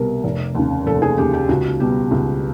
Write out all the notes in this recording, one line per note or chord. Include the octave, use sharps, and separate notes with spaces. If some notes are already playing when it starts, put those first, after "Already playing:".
Already playing: C2 B2 G3 A#4
F1
D#2 C#3
F1 A4
G#4
D#2 C#3 G4
G4
C#2 F#4
B2 G3 G4
C#2